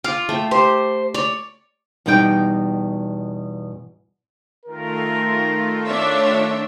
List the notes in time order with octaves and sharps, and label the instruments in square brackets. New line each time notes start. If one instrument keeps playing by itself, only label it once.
[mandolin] F4 [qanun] D6
[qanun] A3 G5
[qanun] G4 [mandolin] C5
[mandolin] C#5 [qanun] D5
[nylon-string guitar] E2 B2 G3 D#4 G4 G5
[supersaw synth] D#3 A3 F4 [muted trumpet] A#4
[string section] D4 C#5 E5